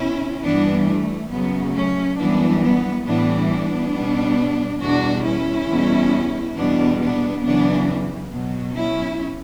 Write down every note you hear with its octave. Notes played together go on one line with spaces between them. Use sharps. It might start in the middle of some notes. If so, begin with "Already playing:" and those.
Already playing: B2 C#4 E4
G2 E3 G3 B3 D4
A3
F#2 C#3 F#3 B3
A3 C#4
F#2 E3 G3 B3 D4
B3
A2 E3 G3 B3 D4
B3 D4
B2 G3
E2 B2 G3 D4 F#4
C#4 E4
E2 B2 G3
E2 B2 G3 B3 D4
B3 D4
F#2 C#3 E3 B3 D4
B2 F#3
C#4 E4